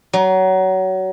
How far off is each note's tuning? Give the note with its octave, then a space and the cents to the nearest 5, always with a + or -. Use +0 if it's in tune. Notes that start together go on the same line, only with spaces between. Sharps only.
F#3 +25